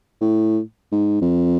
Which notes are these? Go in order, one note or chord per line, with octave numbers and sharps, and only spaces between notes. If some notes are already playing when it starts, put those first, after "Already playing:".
A2
G#2
F2